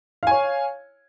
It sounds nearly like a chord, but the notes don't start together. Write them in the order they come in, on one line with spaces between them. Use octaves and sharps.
F5 G#5 C#5